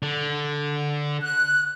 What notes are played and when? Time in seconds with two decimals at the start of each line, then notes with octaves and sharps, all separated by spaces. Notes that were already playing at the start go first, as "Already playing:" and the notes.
0.03 D3
1.21 F#6